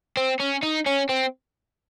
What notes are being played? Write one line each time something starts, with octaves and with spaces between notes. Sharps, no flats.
C4
C#4
D#4
C#4
C4